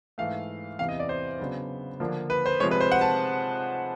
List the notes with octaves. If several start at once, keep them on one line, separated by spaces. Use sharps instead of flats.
G#2 E3 A3 F5
E2 C3 E3 F5
D#5
D5
C5
C#3 F#3 B3 D4
D3 F3 A#3 D4
B4
C5
C3 F3 G#3 C#5
B4
C5
F#5
A5